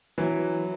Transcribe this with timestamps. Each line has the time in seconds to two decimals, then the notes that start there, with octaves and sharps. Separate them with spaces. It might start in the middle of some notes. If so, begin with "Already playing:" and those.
0.18 E3 F#3